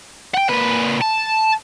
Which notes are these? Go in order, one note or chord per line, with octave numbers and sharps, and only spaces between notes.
F#5 G5
A#2 B4
A5